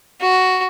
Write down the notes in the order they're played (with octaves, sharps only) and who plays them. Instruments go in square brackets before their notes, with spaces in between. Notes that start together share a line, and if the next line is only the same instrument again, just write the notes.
[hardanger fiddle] F#4